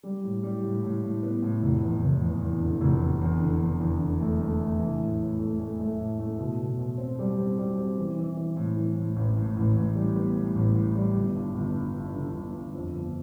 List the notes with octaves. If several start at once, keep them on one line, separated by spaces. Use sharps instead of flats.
G3
A2
G3
A2
A2
A2
B3
A2
F1
E2
F1
E2
E2
D3
F1
F1
E2
D3
E2
E2
D3
A3
A3
A3
E3
A2
A2
A3
A3
A3
A2
A3
B2
B2
B2
C4
G3
C4
G3
C4
E3
E3
E3
A2
E3
A2
A1
A2
A1
A1
G3
B3
A2
A1
A2
G3
G1
G2
G1
G2
G2
D3
G1
G2
F2
G1